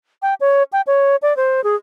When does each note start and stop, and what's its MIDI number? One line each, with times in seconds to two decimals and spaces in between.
0.22 0.34 79
0.40 0.63 73
0.73 0.81 79
0.87 1.16 73
1.22 1.36 74
1.37 1.63 72
1.64 1.75 68